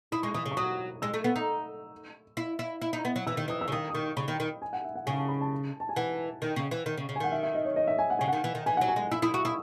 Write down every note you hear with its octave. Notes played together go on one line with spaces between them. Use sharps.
E4 D#6
G#3 C#6
E3 D#6
C#3
C#6
F#3 D#6
G#3 E6
A3
B3
D#4
E4
E4
E4
D#4
B3
F#3
E3 E6
D#3
E3 D#6
E6
C#3
D#3 D#6
D#6
D#3 C#6
C#3 B5
D#3
D#3
G#5
F#5
E5
F#5
C#3 G#5
A5
B5
A5
A5
G#5
E3 F#5
D#3
C#3
E3
D#3
C#3
C#3
G#5
D#3 F#5
E5
E5
D#5
C#5
D#5
E5
G#5
F#5
C#3 G#5
D#3 F#5
E3
D#3
E3 G#5
F#3 F#5
G#5
G#3
E4 E6
E4 D#6
F#4 C#6
E4 D#6